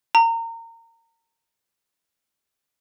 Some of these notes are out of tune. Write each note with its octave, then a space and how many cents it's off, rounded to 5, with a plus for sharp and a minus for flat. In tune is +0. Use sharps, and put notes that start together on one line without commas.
A#5 -25